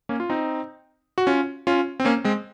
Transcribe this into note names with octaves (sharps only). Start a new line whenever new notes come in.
A#3 C#4
F4
C4 D#4
F#4
C#4 F4
C#4 F4
C4
A#3 C#4
G#3 C4